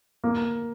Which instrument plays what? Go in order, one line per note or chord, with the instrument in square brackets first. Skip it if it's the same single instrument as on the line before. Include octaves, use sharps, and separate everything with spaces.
[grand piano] A#3